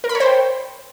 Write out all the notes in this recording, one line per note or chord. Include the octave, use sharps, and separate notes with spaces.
A#4
B5
C#5
C5
G5